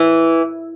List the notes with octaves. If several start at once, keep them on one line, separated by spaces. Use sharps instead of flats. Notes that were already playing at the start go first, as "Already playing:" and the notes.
Already playing: E3